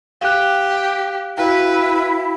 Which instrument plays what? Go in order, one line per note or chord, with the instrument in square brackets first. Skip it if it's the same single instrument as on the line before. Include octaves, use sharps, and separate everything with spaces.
[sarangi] G4 [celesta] F5 F#6
[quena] E4 [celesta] F#4 F5 G5 [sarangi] B4